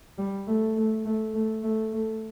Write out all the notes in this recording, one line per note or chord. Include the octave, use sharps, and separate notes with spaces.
G3
A3
A3
A3
A3
A3
A3